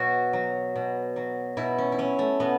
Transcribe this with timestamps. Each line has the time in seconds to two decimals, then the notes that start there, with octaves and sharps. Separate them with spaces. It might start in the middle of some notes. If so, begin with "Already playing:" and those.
Already playing: B2 F#3 F#4
0.33 F#3
0.75 B2
1.16 F#3
1.57 B2 E4
1.78 C#4
1.92 E4
1.98 F#3 C#4
2.19 A3
2.40 B2 B3